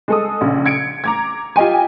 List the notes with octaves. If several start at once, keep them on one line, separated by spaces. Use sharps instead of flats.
G#3 A4 D#6
A#1 C#3
G#6 C#7 D7
A#5 D6 G#6
F4 G4 D#5 G5 G#5